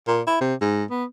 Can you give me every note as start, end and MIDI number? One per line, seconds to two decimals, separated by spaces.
0.07 0.22 46
0.27 0.38 64
0.41 0.55 48
0.62 0.84 44
0.91 1.05 59